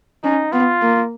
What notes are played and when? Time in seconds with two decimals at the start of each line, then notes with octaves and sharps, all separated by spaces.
0.24 C#4 D#4
0.52 B3 F4
0.82 A#3